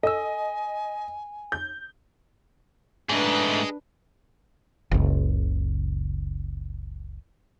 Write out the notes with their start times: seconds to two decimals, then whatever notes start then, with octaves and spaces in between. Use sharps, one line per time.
0.03 A4 D#5 G#5 E6
1.52 G6
3.09 G#2 A3 D4 G#4 B4 D#5
4.91 F#1 C#2